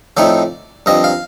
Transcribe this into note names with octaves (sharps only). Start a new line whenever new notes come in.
A2 F3 A3 C4 D#4 D5
G2 F3 C4 D#5
F5